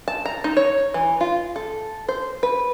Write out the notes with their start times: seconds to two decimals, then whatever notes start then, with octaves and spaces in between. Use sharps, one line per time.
0.08 A5
0.26 A#5
0.44 D#4
0.57 C#5
0.94 E3
1.21 F4
1.56 A4
2.09 C5
2.43 B4